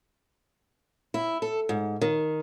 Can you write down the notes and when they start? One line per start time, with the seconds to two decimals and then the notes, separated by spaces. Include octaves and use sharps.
1.14 E4
1.42 A4
1.69 G#2
2.01 D#3